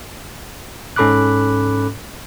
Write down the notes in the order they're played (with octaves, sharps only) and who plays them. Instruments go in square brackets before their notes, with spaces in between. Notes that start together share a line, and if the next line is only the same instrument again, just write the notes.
[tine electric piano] G#2 C#4 A4 B5 D6 F#6